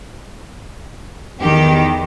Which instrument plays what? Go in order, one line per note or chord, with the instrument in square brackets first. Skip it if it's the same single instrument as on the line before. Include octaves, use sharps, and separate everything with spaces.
[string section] E2 D#3 [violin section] G4